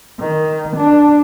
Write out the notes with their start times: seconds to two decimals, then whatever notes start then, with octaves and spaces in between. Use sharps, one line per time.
0.20 D#3
0.76 D4